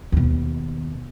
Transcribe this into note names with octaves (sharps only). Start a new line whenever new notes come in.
D#2 B2